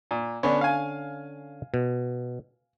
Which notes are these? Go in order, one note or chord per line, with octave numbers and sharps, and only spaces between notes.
A#2
D3 B3 C#4 D4 C#5
F5 G#5
B2